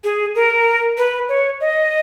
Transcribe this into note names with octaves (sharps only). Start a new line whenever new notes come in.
G#4
A#4
B4
C#5
D#5